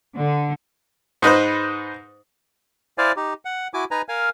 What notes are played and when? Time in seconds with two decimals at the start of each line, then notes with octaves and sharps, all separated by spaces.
0.16 D3
1.22 G#2 D#4 B4 C5
2.98 E4 C5 D5 F5 G#5
3.17 D#4 G4
3.45 F#5
3.74 E4 F#4 G#5 D6
3.91 D#4 B4 G#5 A#5
4.09 A#4 F5 G#5